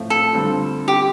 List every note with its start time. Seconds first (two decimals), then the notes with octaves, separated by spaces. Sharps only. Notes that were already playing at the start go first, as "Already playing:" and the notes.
Already playing: A2 F3 A3 C4 F4
0.10 A4
0.33 D3 G3 C4 F4
0.88 G4